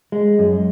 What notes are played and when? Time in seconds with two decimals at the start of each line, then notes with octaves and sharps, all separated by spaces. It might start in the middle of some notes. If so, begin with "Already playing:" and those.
0.12 G#3
0.39 F#2